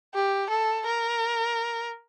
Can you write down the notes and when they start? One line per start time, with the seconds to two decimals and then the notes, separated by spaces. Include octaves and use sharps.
0.14 G4
0.50 A4
0.86 A#4